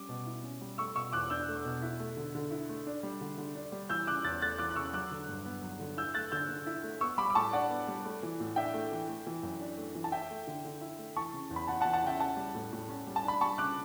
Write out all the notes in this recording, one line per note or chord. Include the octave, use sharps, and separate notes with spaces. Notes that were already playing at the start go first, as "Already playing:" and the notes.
Already playing: G3 C#4 D6
B2
E4
C#4
G3
A3 C#6 E6
B2 C#6 E6
E2 D6 F#6
D4 E6 G6
A3
B2
E4
A3
D3
D3
E4
A3
D4
G3
D3
D3
D4
G3
E3 E6 G6
C#3 D6 F#6
E2 F#6 A6
A3 F#6 A6
E3 D6 F#6
F#6
C#3 C#6 E6
F#3 D6 F#6
D3
G2
B3
F#3
D3
E4 E6 G6
A3 F#6 A6
D3 E6 G6
D3
E4
A3
B3 C#6 E6
G3 B5 D6
D6
A2 A5 C#6
D4 D5 F#5
B3
G3
A3
E3
A2
D4 E5 G5
A3
E3
A3
E3
F#2
D4
A3
E3
A5
E4 E5 G5
A3
D3
D3
E4
A3
E3 A5 C#6
C#3
E2
B5
E2 F#5 A5
F#5 A5
E3
F#5 A5
C#3 E5 G5
C#4 F#5 A5
G3
A2
A2
C#4
G3
A5
D4 B5
G3 A5 C#6
C#3 D6 F#6